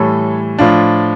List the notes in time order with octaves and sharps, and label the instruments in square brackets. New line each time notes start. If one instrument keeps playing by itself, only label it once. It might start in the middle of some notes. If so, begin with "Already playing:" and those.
Already playing: [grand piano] A2 E3 G3 A4 C#5
A2 F3 D4 F4